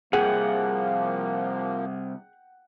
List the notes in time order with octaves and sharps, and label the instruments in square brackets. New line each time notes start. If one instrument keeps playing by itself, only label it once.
[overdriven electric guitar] C2 [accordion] F3 A#3 [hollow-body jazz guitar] G#4 [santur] F#5 G5